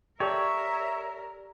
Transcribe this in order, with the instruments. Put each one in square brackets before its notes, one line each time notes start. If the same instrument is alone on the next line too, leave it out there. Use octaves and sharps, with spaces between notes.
[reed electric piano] G4 A4 D5 [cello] A#4 [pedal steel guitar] C#5 [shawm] E5